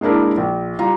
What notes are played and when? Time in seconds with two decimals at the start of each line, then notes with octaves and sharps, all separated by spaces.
0.01 G#3 A#3 D4 E4 A#4
0.37 A#1
0.79 G3 F4 A#5